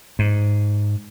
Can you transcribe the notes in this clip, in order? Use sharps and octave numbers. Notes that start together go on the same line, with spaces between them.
G#2